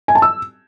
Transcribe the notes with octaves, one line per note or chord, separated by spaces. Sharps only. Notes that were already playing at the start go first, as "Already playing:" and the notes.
G#5
A5
E6